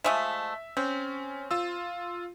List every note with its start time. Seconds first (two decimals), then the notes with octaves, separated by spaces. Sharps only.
0.04 F3 G#3 A3 E5
0.77 C4 C#4
1.51 F4 E6